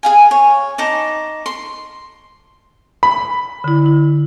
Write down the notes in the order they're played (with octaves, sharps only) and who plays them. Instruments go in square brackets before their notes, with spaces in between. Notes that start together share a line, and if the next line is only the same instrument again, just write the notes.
[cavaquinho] G#4 F5 G#5
C#5
D#4 A5 D6
C6
[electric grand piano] B5
[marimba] D3 E4
E4